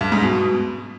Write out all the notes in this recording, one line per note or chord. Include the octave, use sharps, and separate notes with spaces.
G2
G#2
B2